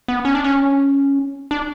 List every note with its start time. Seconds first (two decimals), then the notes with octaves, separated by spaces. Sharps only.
0.08 B3
0.25 C#4
0.35 D4
0.44 C#4
1.51 D4